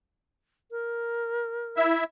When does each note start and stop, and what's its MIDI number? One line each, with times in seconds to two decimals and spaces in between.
0.71 1.86 70
1.77 2.04 64
1.77 2.04 76